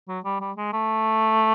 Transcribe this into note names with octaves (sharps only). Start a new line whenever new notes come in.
F#3
G3
G3
G#3
A3